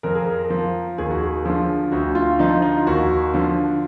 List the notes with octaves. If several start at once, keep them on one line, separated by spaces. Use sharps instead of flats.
F2 A#4
G#4
A#4
F3
D#2 G#4
F#4
G#4
D3 F3
D2 F#4
F4
D3 F3 D#4
D#4
F4
D#2 F#4
D3 F3